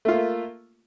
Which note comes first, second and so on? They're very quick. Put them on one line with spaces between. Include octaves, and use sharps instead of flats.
A3 F4 A#3